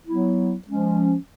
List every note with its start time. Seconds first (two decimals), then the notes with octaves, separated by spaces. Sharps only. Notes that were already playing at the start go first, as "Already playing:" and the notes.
0.05 F#3 B3 E4
0.66 F3 G#3 C#4